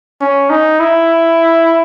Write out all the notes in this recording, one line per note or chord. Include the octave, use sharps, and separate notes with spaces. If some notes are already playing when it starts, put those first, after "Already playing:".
C#4
D#4
E4